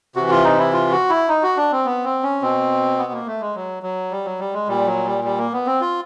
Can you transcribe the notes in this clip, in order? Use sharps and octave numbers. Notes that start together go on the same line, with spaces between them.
C3 E3 F#4
F4
D#4
E4
F4
F#4
E4
D#4
F#4
D4
C4
B3
C4
C#4
B2 C4
B3
A#3
A3
G#3
F#3
F#3
G3
F#3
G3
G#3
A#2 G3
F#3
G3
G3
A#3
B3
C4
F4